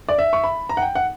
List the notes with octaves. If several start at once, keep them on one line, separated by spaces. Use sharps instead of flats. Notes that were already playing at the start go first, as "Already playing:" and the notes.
D5
E5
C#6
B5
A#5
F#5
G5
F#5